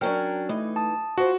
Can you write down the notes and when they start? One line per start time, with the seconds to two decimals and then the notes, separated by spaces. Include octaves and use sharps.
0.01 F#3 C#4 D4 A#4 G5 F6
0.49 E3 A3 D#4
0.76 A5 D#6
1.18 F4 F#4 C5